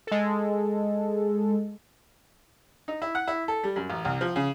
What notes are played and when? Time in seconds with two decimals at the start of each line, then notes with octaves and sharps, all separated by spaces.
0.07 G#3 A4
2.88 D#4
3.02 E4
3.15 F#5
3.27 E4
3.48 A4
3.64 G3
3.76 F#2
3.90 A1
4.05 C2
4.21 F3
4.36 C#3